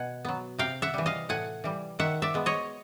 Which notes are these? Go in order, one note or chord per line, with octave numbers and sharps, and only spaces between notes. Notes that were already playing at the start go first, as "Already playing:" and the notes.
Already playing: B2 F#5 G#5
F#3 B3
C3 F5 G5
E5 F#5
E3 G3
D#5 F5
A2 F#5 G#5
E3 G3
D#3 E5 F#5
D5 E5
G#3 B3
C#5 D#5